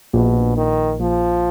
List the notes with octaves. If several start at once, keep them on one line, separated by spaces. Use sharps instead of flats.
A#1 B2
A#1 D#3
A#1 F3